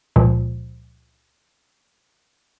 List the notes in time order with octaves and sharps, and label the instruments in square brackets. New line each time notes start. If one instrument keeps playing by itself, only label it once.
[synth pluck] C#2 A#2 F3